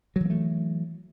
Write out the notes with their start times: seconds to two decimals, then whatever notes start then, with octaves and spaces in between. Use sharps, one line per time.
0.16 F#3
0.20 E3
0.25 A#3
0.30 A3